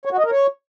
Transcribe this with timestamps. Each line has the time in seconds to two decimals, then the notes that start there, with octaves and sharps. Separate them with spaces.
0.05 C#5
0.12 F#4
0.18 D#5
0.25 A#4
0.31 C#5